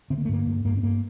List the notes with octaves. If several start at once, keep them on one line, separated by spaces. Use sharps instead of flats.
D3 C4
A#3
A3
G2 A#3
G2
G2 A#3
C4
G2 A#3